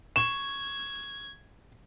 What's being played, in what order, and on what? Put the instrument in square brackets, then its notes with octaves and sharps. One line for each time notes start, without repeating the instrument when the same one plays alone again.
[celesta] C#6 [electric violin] G#6 [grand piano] E7